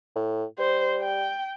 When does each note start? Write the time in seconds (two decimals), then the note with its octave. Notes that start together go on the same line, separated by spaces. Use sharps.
0.16 A2
0.59 G3 C5
1.02 G5